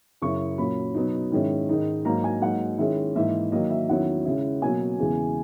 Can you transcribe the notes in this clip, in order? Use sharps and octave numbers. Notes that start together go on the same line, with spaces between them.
F#2 C#3 F#3 C#4 E4 C#6
A#2 F#3 C#4 B5
B2 F#3 B3 D#4
G#2 D#3 G#3 C#4 E4
G#2 D#3 G#3 D#4
G#2 F#3 A#3 A#5
G#5
G#2 F#3 A#3 F#5
D#3 G#3 C#4 E4 E5
G#2 E3 A#3 E4 E5
D#3 F#3 A#3 D#5
E5
E2 D#3 F#3 C#4 E4 F#5
C#3 G#3 C#4 E4
B2 F#3 A#3 G#5
E2 C#3 E3 G#3